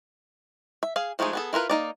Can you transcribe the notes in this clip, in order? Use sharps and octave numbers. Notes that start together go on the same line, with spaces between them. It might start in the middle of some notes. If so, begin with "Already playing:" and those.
E5
G#4 F5
F3 G#3 A3 D#4 G#4
B3 G#4 A4
E4 F4 A#4 B4
A#3 D#4 D5